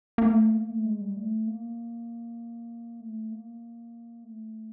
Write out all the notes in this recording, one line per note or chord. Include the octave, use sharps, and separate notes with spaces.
A#3
A3
A#3
A3
G#3
G3
A3
A#3
A3
A#3
A3